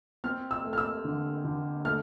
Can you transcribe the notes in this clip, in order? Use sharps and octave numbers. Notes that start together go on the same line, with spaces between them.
C4 F6
E6
A3
F6
E6
D3
D3
A3 F6